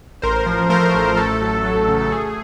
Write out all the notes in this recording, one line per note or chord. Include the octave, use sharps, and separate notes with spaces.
A1 A#4 C5
F3
A3 A#4 C5
A1
A3 A4
F#3
F#3
C#3
A3 G#4